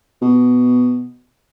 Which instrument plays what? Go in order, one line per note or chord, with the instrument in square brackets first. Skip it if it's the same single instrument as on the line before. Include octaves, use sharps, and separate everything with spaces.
[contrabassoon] B2